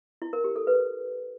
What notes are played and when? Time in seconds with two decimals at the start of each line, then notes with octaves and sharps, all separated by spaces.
0.22 E4
0.33 A#4
0.44 G4
0.56 A4
0.67 B4